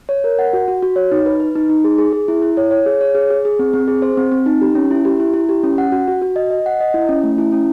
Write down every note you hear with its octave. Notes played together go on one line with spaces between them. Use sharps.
C#5
A#4
F#5
F#4
F#4
F#4
C#5
D#4
B4
B4
D#4
D#4
G#4
G#4
G#4
E4
E4
C#5
C#5
G#4
C#5
G#4
G#4
G#4
C4
C4
G#4
C5
C4
C4
D#4
G4
C#4
E4
G4
E4
E4
G4
C#4
F#5
F#4
F#4
F#4
D#5
D#5
F#5
D#5
E4
C#4
A3
E4
C#4